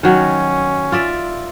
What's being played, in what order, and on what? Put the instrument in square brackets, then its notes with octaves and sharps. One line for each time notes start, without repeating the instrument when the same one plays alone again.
[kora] D#3 F#3 [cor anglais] C#4
[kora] F4 D5 E5